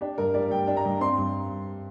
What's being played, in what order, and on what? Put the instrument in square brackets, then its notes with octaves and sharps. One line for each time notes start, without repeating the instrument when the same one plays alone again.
[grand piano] D4 G4
G2 A#4
G3 D5
G2 G5
D4
A#5
G2
C4 C6
G2